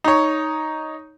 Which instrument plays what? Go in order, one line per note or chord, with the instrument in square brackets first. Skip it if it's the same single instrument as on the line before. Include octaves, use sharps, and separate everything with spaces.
[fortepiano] D#4 C#5